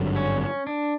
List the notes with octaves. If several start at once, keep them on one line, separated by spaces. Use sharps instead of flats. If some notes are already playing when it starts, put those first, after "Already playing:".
Already playing: G#1 G2 D3 F#3
C#4
C#4
D4